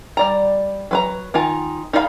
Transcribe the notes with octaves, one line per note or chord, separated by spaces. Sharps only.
G3 D5 A#5
F#3 B4 A#5
D#3 D#4 F4 G#5 A#5
D#4 G#4 D5 F5 B5